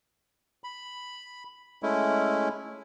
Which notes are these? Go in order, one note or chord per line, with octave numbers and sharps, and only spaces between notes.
B5
G#3 A3 C#4 E4